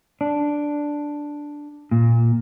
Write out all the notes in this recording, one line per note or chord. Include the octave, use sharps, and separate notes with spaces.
D4
A#2